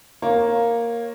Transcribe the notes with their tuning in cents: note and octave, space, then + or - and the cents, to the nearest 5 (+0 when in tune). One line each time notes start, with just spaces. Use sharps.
A#3 +0 C#5 -20